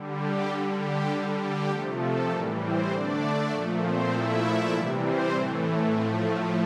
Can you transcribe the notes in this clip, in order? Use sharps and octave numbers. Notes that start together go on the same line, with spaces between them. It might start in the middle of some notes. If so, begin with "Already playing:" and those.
Already playing: D3 G3
G4
D3 G3 A4
G4
D3 G3 A4
G4
C3 F3 A3 A4
A4
A2 E3 G3 A#3 A#4
C4 C5
D3 A3 D4 D5
A#2 F3 A3
C4 C5
A#2 F3 A3 E4 E5
C3 E3 G3 D4 D5
C4 C5
A2 E3 A3
A2 F3 A3 C4 C5